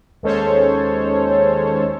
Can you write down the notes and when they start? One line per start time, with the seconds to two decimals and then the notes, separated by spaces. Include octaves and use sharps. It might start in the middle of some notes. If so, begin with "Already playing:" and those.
0.23 D#2 G#3 C#4 A4 C5 C#5